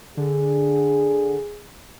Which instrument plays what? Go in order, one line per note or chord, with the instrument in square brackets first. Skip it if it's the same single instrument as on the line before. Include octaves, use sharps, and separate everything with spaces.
[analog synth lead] D3 [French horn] G#4